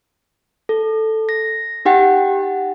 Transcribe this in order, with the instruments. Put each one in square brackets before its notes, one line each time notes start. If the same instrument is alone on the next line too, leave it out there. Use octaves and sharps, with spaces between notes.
[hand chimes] A4
A#6
D#4 G4 F#5 G5